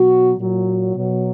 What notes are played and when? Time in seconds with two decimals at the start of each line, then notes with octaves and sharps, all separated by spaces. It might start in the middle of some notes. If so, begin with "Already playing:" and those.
Already playing: B2 F#3 F#4
0.37 A#2 F#3
0.95 B2 F#3